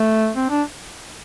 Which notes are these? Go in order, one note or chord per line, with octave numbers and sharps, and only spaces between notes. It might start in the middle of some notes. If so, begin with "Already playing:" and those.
Already playing: A3
C4
D4